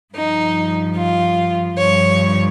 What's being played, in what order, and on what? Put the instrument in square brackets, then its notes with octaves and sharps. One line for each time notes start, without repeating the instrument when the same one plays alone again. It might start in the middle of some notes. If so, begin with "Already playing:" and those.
[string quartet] G2 F3 D#4
F4
G2 F3 C#5